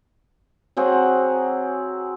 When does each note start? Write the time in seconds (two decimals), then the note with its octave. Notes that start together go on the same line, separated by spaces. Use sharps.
0.77 F#3 C4 G#4 F#5